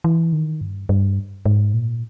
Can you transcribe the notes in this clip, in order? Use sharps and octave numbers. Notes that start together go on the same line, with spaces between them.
E3
D#3
G2
G2
G#2
A#2